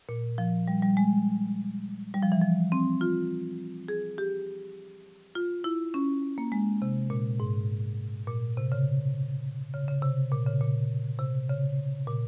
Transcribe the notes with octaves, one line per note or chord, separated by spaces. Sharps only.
A#2
F3
G3
G3
G#3
G3
F3
E3
F3
C4
F4
G#4
G4
F4
E4
C#4
A#3
G#3
C3
A#2
G#2
A#2
C3
C#3
C#3
C#3
C3
A#2
C#3
A#2
C3
C#3
A#2